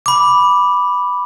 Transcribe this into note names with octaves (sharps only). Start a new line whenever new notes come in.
B5 D6